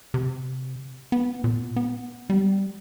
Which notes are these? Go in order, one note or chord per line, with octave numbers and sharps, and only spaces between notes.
C3
B3
A#2
B3
G3